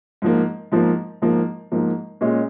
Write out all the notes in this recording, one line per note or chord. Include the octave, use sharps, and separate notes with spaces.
G#2 F3 A#3
G#2 F3 A#3
G#2 F3 A#3
G#2 F3 A#3
A#2 G#3 C#4